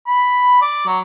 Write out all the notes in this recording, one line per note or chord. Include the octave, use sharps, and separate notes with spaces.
B5
D5
F#3